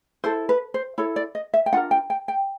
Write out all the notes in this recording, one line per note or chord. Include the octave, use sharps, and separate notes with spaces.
E4 A4 C5
B4
C5
E4 A4 C#5
D5
D#5
E5
G5
D4 F4 A#4 F#5
G5
G5
G5